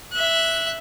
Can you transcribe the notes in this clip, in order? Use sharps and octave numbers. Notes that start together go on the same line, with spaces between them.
E5 F#6